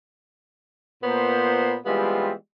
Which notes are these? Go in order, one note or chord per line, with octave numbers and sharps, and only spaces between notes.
A#2 B3 C5
E3 G3 G#3 B3 C4 F4